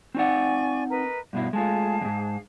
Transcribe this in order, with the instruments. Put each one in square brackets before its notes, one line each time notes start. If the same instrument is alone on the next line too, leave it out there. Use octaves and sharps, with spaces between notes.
[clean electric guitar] C4 D#4 F#5 [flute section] D5 G#5 C#6
[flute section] A#4 B4 D#5
[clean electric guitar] G2 B2 E4 [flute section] F5
[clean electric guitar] G#3 A3 F4 [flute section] G#4 F5 A5
[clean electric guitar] E2 G#2